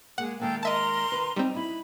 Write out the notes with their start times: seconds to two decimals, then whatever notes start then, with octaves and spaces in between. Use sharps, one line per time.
0.18 G#3 A#3 G#4 F#5
0.40 D#3 G#3 A#3 A4 F5 G5
0.63 A#4 D#5 E5 A5 A#5 C6
1.12 D#3 B4
1.36 G3 C4 D#4
1.55 D#4 E4 B5